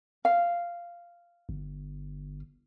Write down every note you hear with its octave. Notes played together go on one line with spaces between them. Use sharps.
F5
G1